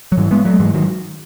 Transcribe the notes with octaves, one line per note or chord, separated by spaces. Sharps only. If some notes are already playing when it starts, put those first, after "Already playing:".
F#3
G#2 E3
G#3 B3
F#3 A3
G#2 E3 G#3
D#3 F#3